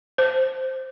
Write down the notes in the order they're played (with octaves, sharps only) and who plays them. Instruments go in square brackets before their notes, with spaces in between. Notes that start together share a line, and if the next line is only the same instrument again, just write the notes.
[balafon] C5